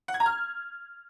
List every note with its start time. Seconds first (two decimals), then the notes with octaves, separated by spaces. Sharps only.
0.08 F#5
0.14 G#6
0.20 A#5
0.26 F6